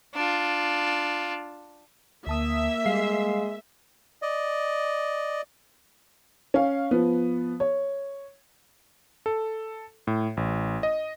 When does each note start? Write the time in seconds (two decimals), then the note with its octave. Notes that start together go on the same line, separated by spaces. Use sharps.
0.15 D4 F4
2.27 D2 A#3 E5 A5 D#6
2.86 G3 G#3 F5 C7
4.22 D5 D#5
6.54 C#4 F5
6.91 F3 B3
7.60 C#5
9.26 A4
10.07 A2
10.37 A1
10.83 D#5